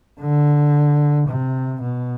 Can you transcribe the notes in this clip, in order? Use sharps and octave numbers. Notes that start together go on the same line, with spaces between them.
D3
C3
B2